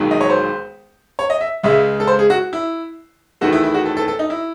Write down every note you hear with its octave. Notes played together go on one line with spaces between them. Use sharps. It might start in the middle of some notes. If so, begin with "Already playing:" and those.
Already playing: E1 D#2 D#3 F#3
D#5
C#5
C5
C#5
D#5
E5
C#2 C#3 G#3 E5
A4
C5
G#4
F#4
E4
E2 D#3 A3 F#4
E4
E4
F#4
A4
A4
A4
D#4
E4